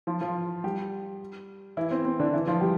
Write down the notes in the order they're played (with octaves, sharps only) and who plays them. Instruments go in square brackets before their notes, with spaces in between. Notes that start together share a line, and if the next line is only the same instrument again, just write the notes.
[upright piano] F3 F4
F3 F4
G3 G4
E3 E4
C4
C4
D3 D4
E3 E4
F3 F4
G3 G4